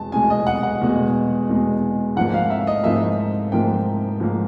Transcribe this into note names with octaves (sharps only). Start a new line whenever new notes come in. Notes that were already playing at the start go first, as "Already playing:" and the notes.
Already playing: E2 B2 G#3 A5
E2 B2 G#3 G#5
D#5
F#5
F#5
E2 B2 G#3
E2 B2 G#3
G#2 F3 A#3 F#5
F5
E5
D#5
G#2 F3 A#3 E5
G#2 F3 A#3 G5
G#2 F3 A#3